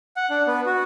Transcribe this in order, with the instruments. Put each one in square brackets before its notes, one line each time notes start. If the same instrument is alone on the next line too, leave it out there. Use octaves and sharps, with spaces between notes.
[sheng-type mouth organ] F#5
D4
B3
F#4